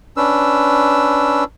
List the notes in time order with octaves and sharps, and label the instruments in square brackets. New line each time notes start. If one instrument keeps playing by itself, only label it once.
[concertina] C#4 D4 B4 E6